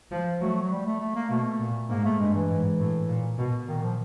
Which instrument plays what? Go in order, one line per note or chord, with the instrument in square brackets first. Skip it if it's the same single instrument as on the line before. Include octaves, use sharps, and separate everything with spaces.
[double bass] F3
[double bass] F#3 [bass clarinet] A3
[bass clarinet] F#3
G3
A3
A3
A#3
[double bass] B2 [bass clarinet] A3
[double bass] A#2
[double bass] G#2 [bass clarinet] A#3
[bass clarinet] A3
[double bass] G2 [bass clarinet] G#3
[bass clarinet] E3
[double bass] G#2
A2
A#2
B2
[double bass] A#2 [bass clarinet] D#3
[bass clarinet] F3